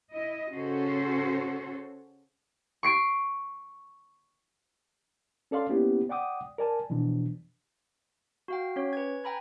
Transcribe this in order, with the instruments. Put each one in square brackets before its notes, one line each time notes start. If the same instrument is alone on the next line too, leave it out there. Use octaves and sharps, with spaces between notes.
[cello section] E4 D#5
C#3 C#4 F#4 A4 C5 C#5
[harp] C#6 C7 D7
[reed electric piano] C#4 A4 D5 F5 C6
A#3 B3 C#4 E4 G4
D5 F#5 G5 D6 D#6
A#4 D5 G#5 A5
B2 E3 F3 D4
[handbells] F#4 F5 G5
C#4 C#5
B4 G#6
G5 G#5 A#5 B5 G#6